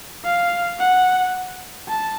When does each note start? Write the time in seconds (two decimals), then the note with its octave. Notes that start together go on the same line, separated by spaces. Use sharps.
0.25 F5
0.79 F#5
1.88 A5